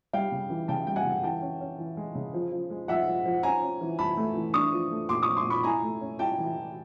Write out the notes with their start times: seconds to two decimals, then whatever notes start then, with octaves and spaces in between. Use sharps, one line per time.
0.13 G3 F5 G5
0.32 C#3
0.50 E3
0.68 C#3 G5 A5
0.87 G3 G5
0.96 F#5 G#5
1.05 C#3
1.23 E3 G5 A5
1.42 C#4
1.61 C#4
1.78 E3
1.97 G#3
2.15 C#3
2.34 F3
2.52 F3
2.70 G#3
2.88 F3 E5 F#5
3.07 F3
3.25 F3
3.43 C#4 G#5 A#5
3.62 C#4
3.81 E3
3.99 E3 A5 B5
4.17 A3
4.35 E3
4.54 D4 C#6 D#6
4.72 F3
4.91 A3
5.09 A#2 C6 D6
5.22 C#6 D#6
5.28 F3
5.36 C6 D6
5.45 A#2
5.50 B5 C#6
5.63 E4 G#5 A#5
5.83 A3
6.01 C#4
6.19 E4 G5 A5
6.38 E3
6.56 E3